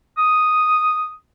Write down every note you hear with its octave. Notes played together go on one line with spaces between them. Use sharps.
D#6